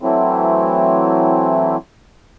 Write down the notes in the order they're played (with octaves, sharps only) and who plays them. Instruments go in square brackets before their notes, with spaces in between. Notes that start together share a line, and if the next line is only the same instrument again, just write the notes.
[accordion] E3 F#3 A3 C4 E4